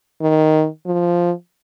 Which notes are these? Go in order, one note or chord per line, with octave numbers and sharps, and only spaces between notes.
D#3
F3